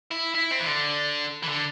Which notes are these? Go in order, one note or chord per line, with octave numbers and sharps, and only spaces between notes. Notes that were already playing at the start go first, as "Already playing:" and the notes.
E4
E4
C4
E3
D3
E3
D3